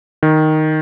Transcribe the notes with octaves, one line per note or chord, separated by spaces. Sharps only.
D#3